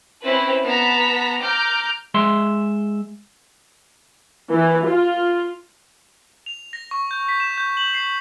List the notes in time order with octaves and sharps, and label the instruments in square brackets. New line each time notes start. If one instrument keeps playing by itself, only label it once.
[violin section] C4 C#4 E4 B4
B3 A5 A#5 B6
A#5 D6 F6 G6
[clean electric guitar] G#3 E5 C6
[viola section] E3
F4
[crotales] F7
A#6
C#6
G6
B6
E7
G6
F#7
C7